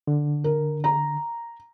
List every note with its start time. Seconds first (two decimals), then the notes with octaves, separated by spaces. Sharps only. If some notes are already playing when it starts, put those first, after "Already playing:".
0.07 D3
0.44 A#4
0.84 A#5